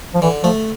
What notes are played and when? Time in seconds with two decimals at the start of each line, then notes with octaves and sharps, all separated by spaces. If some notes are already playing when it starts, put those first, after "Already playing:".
0.14 F3
0.22 D3 E3
0.43 F3 A3